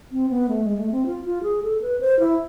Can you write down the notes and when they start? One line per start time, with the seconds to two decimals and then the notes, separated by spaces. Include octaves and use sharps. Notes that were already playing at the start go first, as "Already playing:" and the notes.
0.12 C4
0.30 B3
0.49 A3
0.64 G#3
0.78 A3
0.91 C4
1.06 F4
1.25 F4
1.43 G#4
1.63 A4
1.82 B4
2.01 C5
2.19 E4